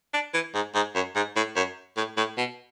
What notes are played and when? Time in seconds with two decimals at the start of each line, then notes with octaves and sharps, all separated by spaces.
0.13 D4
0.34 E3
0.54 G#2
0.75 G#2
0.95 F#2
1.15 G#2
1.36 A2
1.56 F#2
1.97 A2
2.17 A2
2.37 B2